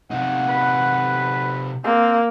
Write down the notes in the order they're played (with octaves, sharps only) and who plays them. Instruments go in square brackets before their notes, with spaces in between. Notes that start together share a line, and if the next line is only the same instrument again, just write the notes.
[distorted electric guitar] C3 D#4 [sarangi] F#5
[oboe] B4
[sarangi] A#3 [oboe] C4